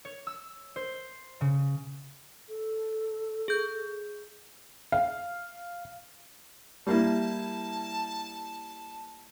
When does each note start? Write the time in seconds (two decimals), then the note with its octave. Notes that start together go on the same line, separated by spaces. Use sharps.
0.05 C#5
0.27 E6
0.76 C5
1.41 C#3
2.48 A4
3.48 G#4 G6
4.92 F5
6.87 G3 A#3 E4 A5